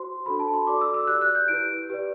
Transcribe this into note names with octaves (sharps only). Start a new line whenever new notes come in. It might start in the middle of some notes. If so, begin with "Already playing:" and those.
Already playing: F#4 C5 C6
D4 F#4 A4 C5 B5
A5
C6
F#4 A4 D5 D6
E6
E6
G4 D5 F#6
F#6
G6
E4 G4 B4 D7
G4 B4 D5